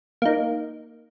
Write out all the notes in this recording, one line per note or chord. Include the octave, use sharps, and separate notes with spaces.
A#3 D#4